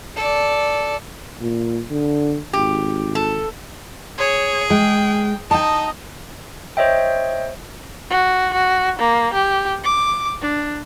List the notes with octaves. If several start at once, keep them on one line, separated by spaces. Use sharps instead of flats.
A4 D5
A#2
D3
G#1 G4
A4
G#4 C#5
G#3 G5
D#4 D#5 G5 A5
C5 C#5 D#5 E5 G5
F#4
F#4
A#3
G4
D6
D4